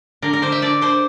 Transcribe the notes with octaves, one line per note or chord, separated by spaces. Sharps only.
D3 A#4
A#4
D3 C5
E5
D3 D5
D3 C5